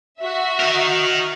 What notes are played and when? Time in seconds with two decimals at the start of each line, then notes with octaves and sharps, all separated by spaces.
0.20 F#4 E5
0.60 D#4 A#4